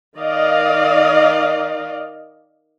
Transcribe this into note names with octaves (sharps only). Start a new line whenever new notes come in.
D#3 D5 D#5 F5